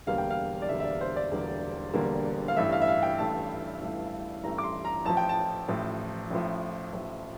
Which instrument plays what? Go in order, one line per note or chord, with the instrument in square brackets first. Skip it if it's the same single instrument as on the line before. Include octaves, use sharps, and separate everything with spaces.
[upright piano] E1 E2 D3 G3 A#3 F5
G5
F5
D5
E1 E2 D3 G3 A#3 E5
E5
D5
C5
D5
E1 E2 D3 G3 A#3
E1 E2 D3 G3 A#3
F5
A1 G2 E3 A3 E5
F5
E5
F5
G5
A1 G2 E3 A3 A5
A1 G2 E3 A3
A1 G2 E3 A3 A#5
D6
C6
A#5
A1 A2 F3 A5
G5
A5
A1 A2 F3
A1 A2 F3
A1 A2 F3